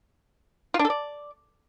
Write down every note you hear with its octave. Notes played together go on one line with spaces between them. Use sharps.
F4
D4
A4
D5